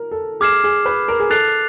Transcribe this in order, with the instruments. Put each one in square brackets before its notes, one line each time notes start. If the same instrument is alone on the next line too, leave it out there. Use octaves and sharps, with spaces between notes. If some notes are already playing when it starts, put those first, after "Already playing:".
Already playing: [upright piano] A#4
A4
[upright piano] G#4 [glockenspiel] D6 F6 G#6 C7 E7
[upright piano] G#4
B4
A#4
G#4
[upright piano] A4 [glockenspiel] F#6 A6 C7 F7